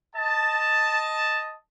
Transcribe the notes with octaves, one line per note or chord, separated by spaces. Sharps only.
D#5 A5